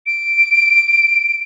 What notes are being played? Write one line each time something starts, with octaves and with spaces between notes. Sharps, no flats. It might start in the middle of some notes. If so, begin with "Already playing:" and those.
D7